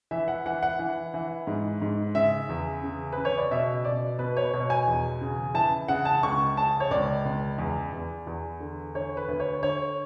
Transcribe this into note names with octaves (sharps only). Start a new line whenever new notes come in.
E3 E5
F#5
E3 F#5
F#5
E3
E3
G#2
G#2
C#3 E5
E2
C#3
B4
C#3
C#5
D5
B2 E5
B2 D5
B2 B4
C#5
B2 C#5
G#5
E2
C#3
E3 A5
C#3 F#5
A5
C#2 C#6
C#3 A5
C#5
C#2 D5
C#2
E2
E2
E2
D3
D3 C#5
B4
D2
C#5
D3 C#5